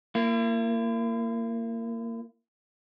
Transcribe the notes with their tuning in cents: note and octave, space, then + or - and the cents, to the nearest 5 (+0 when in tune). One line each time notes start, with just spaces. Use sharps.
A#3 -20 E4 +45